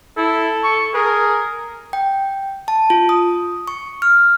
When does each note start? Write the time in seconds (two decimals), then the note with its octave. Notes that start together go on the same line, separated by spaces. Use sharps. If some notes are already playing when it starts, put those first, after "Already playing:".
0.17 E4 A4
0.63 C#6
0.94 G#4 A#4
1.93 G5
2.68 A5
2.90 F4
3.09 D#6
3.68 C#6
4.02 F6